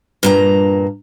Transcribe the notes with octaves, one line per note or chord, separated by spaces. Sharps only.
G2 A#2 A#5